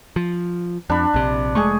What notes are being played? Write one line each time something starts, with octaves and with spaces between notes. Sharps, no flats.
F3
F2 D4 B5
A#1 C3
F1 G#3 A3 G#4 C#6